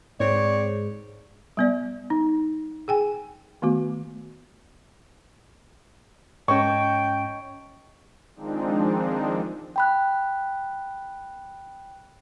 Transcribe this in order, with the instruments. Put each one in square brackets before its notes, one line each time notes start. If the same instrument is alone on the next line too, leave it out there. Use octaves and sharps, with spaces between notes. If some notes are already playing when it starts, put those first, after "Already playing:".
[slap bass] G#2 [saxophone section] C4 C#5 [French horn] D5
[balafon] G3 B3 D5
D#4
G#4 G5 G#5
D#3 A3 B3 F#4
[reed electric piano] G#2 C#4 [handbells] C#5 D#5 A5 [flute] G5 [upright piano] C#6
[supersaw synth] D#3 F3 G#3 C4 D4 D#4
[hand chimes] G5 B5 F#6